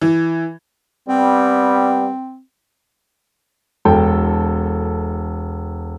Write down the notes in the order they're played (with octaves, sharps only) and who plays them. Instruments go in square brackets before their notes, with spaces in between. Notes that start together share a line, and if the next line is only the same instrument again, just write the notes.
[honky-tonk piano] E3
[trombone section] G3 B3 [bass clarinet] C4
[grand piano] E1 A4 G5